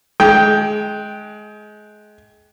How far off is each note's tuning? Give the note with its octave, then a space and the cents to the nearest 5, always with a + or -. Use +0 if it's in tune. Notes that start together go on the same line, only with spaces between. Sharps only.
G#3 +25 G5 +0